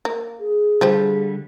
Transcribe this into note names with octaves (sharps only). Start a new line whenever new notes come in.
A#3
G#4
D3 F3 G3 G4 C5